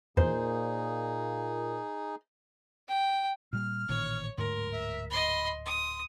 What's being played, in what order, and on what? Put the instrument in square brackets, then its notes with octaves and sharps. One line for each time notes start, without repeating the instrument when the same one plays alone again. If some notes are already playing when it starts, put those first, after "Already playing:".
[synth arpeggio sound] E2 [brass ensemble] A#2 [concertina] D#4 G#4 [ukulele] C5
[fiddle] G5
[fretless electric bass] A#2 G3 [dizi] F6
[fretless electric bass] A1 A#2 D#3 [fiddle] C#5
[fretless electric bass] D1 D2 G#2 [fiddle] A#4 [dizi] C6
[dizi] E5
[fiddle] D#5 C6 [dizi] B5
[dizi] C6 [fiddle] D#6